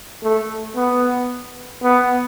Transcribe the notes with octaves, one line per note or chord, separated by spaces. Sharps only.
A3
B3
B3